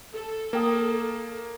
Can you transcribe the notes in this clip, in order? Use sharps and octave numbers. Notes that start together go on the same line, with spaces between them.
A4
A#3 A#4 G5 D#6